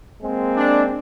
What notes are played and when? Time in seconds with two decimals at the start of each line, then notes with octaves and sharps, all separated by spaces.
0.22 G#3 A#3 C4
0.56 D4